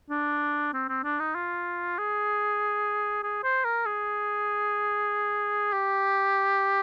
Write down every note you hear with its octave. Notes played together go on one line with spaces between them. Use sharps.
D4
C4
C4
D4
D#4
F4
G#4
G#4
C5
A#4
G#4
G4